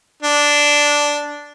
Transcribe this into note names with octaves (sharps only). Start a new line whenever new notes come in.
D4